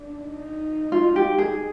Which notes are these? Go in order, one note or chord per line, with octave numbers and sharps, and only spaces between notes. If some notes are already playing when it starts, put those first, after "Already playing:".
Already playing: D4
D#4
F4
G4
G#4